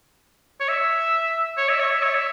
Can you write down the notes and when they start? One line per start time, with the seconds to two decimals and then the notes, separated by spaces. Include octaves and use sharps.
0.60 C#5
0.68 E5
1.57 C#5
1.69 E5
1.79 C#5
1.91 E5
2.02 C#5
2.14 E5